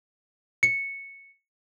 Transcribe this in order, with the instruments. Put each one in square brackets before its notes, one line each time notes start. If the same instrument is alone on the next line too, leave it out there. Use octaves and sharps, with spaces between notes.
[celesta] C#7